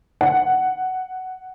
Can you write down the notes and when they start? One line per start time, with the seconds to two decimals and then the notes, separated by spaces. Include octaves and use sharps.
0.21 F#5